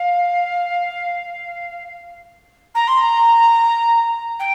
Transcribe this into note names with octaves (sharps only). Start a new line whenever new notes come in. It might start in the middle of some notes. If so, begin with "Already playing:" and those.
Already playing: F5
A#5
C6
A#5
G5